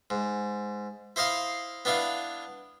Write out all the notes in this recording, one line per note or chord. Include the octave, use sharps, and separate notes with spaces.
G#2
E4 C5 D#5 F5 C6
B3 D4 E4 F5